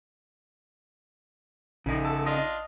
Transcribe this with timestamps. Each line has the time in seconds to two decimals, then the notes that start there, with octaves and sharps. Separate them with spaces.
1.86 A#1 C#3 D#4
2.05 A4
2.26 D4 F4 D#5